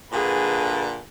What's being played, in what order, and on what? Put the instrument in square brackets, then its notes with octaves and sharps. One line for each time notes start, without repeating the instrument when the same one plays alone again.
[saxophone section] G2 A#2 D3 [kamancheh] G#4 B4